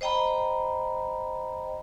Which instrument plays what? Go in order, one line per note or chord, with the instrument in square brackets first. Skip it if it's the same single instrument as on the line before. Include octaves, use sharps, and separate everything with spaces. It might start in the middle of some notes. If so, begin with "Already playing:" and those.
[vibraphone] C5 D#5 G5 A#5 B5